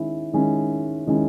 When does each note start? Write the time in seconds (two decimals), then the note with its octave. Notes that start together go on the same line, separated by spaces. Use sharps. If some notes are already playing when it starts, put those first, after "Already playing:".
Already playing: D#3 G#3 C#4 E4
0.33 D#3 G#3 C#4 E4
1.07 D#3 G#3 C#4 E4